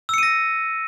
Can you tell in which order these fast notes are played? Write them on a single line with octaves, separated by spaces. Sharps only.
E6 C#7 D#7 A#6